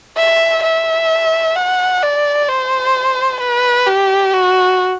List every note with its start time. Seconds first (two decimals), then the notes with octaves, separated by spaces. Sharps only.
0.17 E5
0.63 E5
1.56 F#5
2.02 D5
2.49 C5
3.41 B4
3.87 G4
4.34 F#4